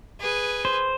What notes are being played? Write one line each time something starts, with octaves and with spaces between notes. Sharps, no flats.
G#4 B4
C5